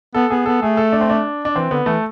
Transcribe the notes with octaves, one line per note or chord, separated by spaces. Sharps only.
B3 A4
B3 G#4
B3 A4
A3 G#4
A4
D4
C4
D4
D4
E3 C4
D3 B3
E3 A3